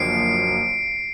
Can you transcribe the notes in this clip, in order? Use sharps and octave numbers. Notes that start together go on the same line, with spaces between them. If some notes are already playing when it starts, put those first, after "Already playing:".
Already playing: F#1 F#2 D3 F3 A#3 C7 D7